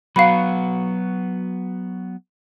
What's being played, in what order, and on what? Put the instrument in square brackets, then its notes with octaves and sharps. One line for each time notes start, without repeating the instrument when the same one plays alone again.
[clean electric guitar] F#3 B3 F#4 [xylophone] F5 B5